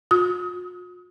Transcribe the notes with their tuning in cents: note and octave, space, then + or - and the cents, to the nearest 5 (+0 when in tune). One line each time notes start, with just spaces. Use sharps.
F4 +45 D#6 +35